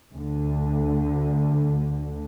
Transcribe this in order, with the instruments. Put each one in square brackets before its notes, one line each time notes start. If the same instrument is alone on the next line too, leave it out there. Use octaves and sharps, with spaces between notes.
[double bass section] D2 D3